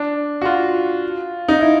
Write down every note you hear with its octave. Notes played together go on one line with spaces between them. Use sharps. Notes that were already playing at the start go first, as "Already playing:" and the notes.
Already playing: D4
F#4
F4
D#4
E4